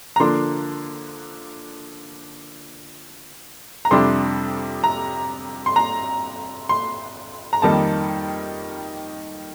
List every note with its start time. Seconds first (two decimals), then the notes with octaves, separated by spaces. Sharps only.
0.16 A#5
0.20 D3 F3 A#3 D4 C6
3.85 A#5
3.91 F2 C3 G3 D4 C6
4.84 A#5
5.66 C6
5.76 A#5
6.69 C6
7.53 A#5
7.62 F2 D#3 G3 A#3 D#4 A5